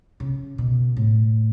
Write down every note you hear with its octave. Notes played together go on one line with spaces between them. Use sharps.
C#3
B2
A2